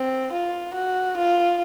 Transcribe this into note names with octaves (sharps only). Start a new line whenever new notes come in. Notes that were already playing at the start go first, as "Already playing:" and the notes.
Already playing: C4
F4
F#4
F4